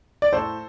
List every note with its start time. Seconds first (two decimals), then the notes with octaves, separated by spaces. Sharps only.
0.22 D5
0.33 A2 A4 C5